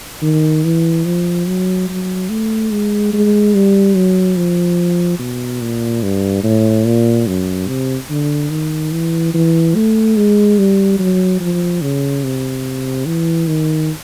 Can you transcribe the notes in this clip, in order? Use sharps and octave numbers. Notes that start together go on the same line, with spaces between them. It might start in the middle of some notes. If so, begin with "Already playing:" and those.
D#3
E3
F3
F#3
F#3
A3
G#3
G#3
G3
F#3
F3
B2
A#2
G2
A2
A#2
F#2
C3
D3
D#3
E3
E3
A3
G#3
G3
F#3
F3
C#3
C3
E3
D#3